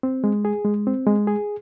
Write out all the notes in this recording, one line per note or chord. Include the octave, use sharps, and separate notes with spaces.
C4
G#3
G#4
G#3
C4
G#3
G#4